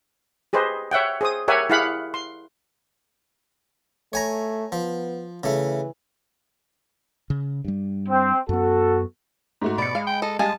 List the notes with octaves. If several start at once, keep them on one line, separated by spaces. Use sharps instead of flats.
G4 G#4 B4 C5 D#5
C#5 E5 F#5 G5
G#4 C5 D#6
G4 A#4 C#5 E5 F#5 G#5
E4 G4 G#4 F5 F#5 B5
C6
A3 C#5 G#5 A#5
F3 B3
C#3 E3 A3
C#3
G2 G3
C4
F#2 B3 F#4 A4
G#2 A3 F#4
B2 D5 B5 C#7
G#3 F5
G5
A4 D#5
G3 G#3 D#5 F5 G#5 A5